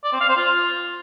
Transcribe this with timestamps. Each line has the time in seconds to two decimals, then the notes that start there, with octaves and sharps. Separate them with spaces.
0.04 D5
0.12 C4
0.21 F5
0.29 C5
0.37 F4